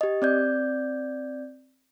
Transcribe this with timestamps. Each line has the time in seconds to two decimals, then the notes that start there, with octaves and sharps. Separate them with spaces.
0.01 G4 D#5
0.22 C4 D5 G6